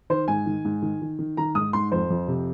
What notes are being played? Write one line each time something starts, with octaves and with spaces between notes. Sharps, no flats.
D#3 C5
G#2 G#5
D#3
G#2
D#3
D#3
D#3
D#3 A#5
G#2 D#6
G#2 C6
F2 C5
F2
C3